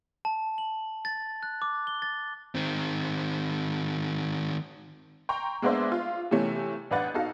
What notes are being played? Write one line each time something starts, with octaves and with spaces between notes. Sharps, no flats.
A5
F#7
A6
F#6
D6
G7
A6
D#3 C4
G5 A#5 C6 C#6
G#3 A#3 B3 D4 C5 E5
F4
C3 E3 A3 C#4
A1 D4 B4 F#5 A6
D#4 F#4 A4 F5